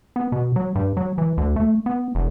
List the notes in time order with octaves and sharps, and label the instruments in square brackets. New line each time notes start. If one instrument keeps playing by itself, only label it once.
[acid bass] B3
B2
F#3
G2
F#3
E3
D2
A3
B3
E1